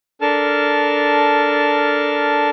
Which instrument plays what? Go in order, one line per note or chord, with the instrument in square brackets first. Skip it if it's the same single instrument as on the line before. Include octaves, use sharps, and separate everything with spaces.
[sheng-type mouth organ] D4 A4 A#4 A5 F6